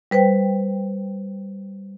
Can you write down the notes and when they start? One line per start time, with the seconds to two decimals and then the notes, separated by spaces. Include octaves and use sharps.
0.11 G3 B4 C5 G5